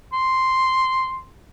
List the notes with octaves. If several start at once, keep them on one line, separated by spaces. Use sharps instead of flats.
C6